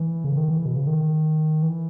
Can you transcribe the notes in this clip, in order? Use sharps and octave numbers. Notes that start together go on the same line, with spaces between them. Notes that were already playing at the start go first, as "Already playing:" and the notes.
Already playing: E3
C#3
D#3
E3
B2
C#3
D#3
E3